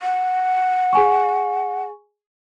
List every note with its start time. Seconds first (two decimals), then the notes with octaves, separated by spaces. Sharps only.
0.02 F#5
0.93 G#4 G#5 C#6